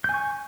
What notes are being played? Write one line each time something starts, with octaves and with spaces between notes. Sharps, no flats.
G#5 C#6 G6